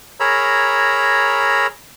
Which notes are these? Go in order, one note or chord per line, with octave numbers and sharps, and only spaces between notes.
G#4 A#4 C#5 A#5 B5 E6